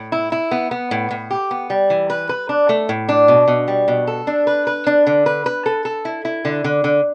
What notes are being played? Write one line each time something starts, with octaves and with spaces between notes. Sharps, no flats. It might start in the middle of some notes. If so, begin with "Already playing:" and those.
Already playing: A2
E4
E4
B3
B3
A2
A2
G4
B3
G3
E3
B4
B4
D4
A3
A2
D4
B2
B2
G3
B2
A4
D4
B4
B4
D4
D3
B4
B4
A4
A4
E4
E4
D3
D3
D3